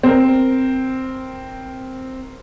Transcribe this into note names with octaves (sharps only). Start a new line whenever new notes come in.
C4 A#4